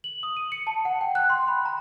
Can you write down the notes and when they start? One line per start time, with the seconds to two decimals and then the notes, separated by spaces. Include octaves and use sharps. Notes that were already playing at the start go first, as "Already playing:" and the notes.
0.04 F#7
0.23 D#6
0.37 D#7
0.52 C#7
0.67 A5
0.85 F#5
1.01 G5
1.15 F#6
1.30 C6
1.48 B5
1.65 A#5